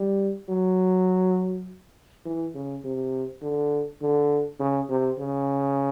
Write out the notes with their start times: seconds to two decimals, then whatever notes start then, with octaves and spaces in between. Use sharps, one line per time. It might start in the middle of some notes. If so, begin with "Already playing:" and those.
Already playing: G3
0.49 F#3
2.26 E3
2.55 C#3
2.84 C3
3.42 D3
4.02 D3
4.60 C#3
4.90 C3
5.19 C#3